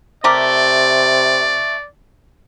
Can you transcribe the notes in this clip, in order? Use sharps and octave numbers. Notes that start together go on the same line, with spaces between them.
C3 A3 G4 A#4 D5